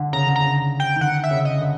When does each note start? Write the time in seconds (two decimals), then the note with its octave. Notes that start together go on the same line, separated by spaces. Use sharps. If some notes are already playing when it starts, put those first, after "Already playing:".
Already playing: D3
0.13 C#3 A#5
0.27 D3
0.36 C#3 A#5
0.80 G5
0.96 D#3
1.01 D3 F#5
1.24 E5
1.31 C#3
1.45 D#5
1.60 D3